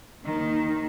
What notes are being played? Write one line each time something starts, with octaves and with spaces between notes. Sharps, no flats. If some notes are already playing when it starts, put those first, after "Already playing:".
D#2 D#3